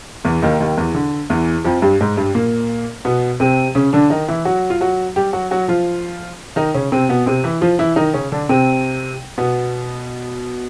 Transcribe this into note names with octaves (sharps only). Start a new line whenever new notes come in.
E2 E3
D#2 D#3
D#2 D#3
E2 E3
D3
E2 E3
F2 F3
G2 G3
G#2 G#3
G2 G3
A#2 A#3
B2 B3
C3 C4
C#3 C#4
D3 D4
D#3 D#4
E3 E4
F#3 F#4
F4
F#3 F#4
G3 G4
F#3 F#4
F#3 F#4
F3 F4
D#3 D#4
C#3 C#4
C3 C4
B2 B3
C3 C4
E3 E4
F3 F4
E3 E4
D#3 D#4
C#3 C#4
D3 D4
C3 C4
B2 B3